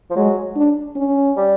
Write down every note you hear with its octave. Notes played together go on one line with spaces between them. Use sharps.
F3
F#3 G#3
D4
C#4
G3